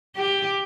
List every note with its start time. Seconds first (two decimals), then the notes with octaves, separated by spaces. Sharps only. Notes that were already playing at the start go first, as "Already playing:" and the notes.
0.16 G4